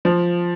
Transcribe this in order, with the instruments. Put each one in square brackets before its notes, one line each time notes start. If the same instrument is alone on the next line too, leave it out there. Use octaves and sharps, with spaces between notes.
[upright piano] F3